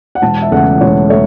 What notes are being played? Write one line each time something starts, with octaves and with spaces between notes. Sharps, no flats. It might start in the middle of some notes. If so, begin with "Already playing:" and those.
F#5
E1 A5
E5
E2 C#3 E3 A3 F#5
E1 C#5
A3 C#5